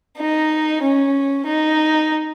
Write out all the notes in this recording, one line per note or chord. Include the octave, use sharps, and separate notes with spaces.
D#4
C#4
D#4